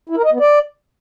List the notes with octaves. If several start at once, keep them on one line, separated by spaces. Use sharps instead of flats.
E4
A#4
D#5
B3
D5